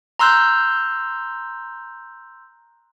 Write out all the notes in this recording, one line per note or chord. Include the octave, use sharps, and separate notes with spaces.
A#5 C6 E6 F#6 G6